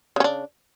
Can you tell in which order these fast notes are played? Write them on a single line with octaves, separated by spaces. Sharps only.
C#3 C#4 D4